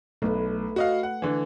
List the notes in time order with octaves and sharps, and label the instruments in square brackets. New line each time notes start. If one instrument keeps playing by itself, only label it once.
[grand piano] B1 [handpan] A3 B4
[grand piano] F#4 D#5 F5
F#5
D3 E3